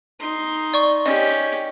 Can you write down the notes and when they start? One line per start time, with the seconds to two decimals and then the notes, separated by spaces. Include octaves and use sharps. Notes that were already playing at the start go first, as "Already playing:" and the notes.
0.20 D#4 C6
0.74 D5 C#6
1.06 C#4 G4 D#5